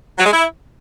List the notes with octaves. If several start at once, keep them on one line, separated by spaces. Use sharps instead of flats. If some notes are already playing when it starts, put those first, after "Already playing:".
F#3
G#3
E4